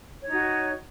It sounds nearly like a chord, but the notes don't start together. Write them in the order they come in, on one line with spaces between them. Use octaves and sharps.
C#5 D#4 F#4